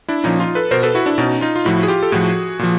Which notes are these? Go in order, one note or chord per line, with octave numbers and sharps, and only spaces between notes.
D4 E4
A#2 F3 C#4 D#4
D#4 F4
A4 B4
B2 A#4 C5
A4 B4
E4 F#4
D4 E4
B2 C#4 D#4
D#4 F4
F4
A2 F3 E4 F#4
G#4
F4 G4
A4
A2 F3 F#4 G#4
A#2 F3